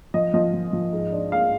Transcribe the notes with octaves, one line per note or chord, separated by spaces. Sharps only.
F3 D#5
F3 D#5
F3
F3
G#2
D4
G#2 F5